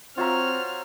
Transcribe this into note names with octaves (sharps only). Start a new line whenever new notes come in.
C4 F4 F#4 C5 C#5 E5 A#5 F6